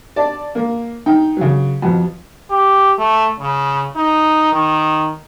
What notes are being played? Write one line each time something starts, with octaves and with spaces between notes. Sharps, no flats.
D5 A5
A#3
D#4 G5
C#3 F#3
F2 B2
G4
A3
C#3
D#4
D#3